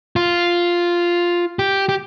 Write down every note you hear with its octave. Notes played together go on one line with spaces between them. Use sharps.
F4
G4
G4